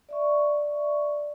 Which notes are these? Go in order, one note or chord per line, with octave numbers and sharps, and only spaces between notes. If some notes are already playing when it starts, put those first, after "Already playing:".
D5 E5 C#6